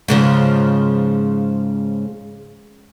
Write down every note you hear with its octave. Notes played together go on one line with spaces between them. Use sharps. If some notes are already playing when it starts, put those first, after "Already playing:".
G#2 C#3 F3